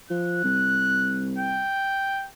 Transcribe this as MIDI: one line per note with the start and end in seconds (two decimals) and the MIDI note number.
0.10 0.39 53
0.10 1.26 90
0.44 1.71 36
1.38 2.28 79